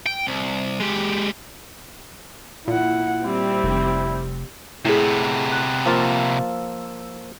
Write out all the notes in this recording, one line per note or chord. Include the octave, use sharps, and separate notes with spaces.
G5
C2
G#3 G4
A#2 E4 F#5
G3 C4 E4 G4
F1
A2 C3 B3 E4 G#4
F#6
F3 A#3 F4 E6